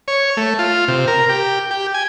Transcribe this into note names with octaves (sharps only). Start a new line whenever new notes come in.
C#5
A3
F4
C3
A#4
G4
G4
G#5